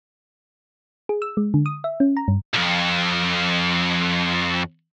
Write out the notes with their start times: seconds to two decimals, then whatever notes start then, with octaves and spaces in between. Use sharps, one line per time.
1.09 G#4
1.22 E6
1.37 G#3
1.54 D3
1.66 D#6
1.84 E5
2.00 C#4
2.17 A#5
2.28 G2
2.54 C2 F2